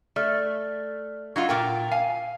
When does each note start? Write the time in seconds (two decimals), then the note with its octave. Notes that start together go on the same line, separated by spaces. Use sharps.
0.16 A3 D5 F6
1.36 F#3 D#4 F4 F#5 G#6
1.49 A#2 F4 A#4 G5
1.91 F5 G#5